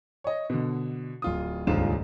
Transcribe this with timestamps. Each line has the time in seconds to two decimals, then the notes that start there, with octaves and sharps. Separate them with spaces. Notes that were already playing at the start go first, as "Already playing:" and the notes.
0.24 C#5 D#5
0.50 B2 D3
1.22 D1 F4 D#6
1.67 D#1 C#2 G#2 D4 F4 E7